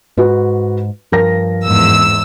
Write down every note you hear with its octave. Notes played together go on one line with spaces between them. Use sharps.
G#2 F#4 B4
G2 F3 A#4 A#6
E2 G#2 E6